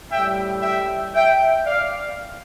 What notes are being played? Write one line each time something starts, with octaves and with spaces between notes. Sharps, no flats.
A2 G3 E5 G5
E5 G5
E5 G5
D5 F5